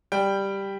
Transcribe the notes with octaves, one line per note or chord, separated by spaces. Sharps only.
G3 G5